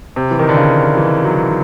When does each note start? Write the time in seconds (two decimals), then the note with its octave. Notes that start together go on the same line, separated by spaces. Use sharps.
0.16 C3
0.31 E3
0.39 D#3
0.49 D3
0.57 C#3
0.97 E3
1.24 F#3
1.43 D3